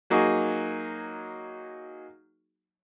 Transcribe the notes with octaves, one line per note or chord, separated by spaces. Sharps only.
F#3 A#3 D#4 F#4 G#4